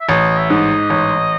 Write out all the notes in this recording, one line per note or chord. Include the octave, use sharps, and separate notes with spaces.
E5
A1 D#5
E5
G#2 D#5
A1